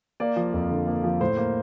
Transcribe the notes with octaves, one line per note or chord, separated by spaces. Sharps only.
A#3 D5
F3
F2
D3
A#3
F3
A2 C5
A#3